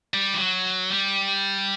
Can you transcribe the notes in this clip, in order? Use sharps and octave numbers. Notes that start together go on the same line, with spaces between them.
G3
E3
F#3
G3